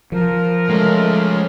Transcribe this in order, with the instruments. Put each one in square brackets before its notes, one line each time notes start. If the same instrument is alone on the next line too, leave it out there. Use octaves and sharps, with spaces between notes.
[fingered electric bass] F3 [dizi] A#4
[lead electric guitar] G#3 C#4 [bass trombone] A3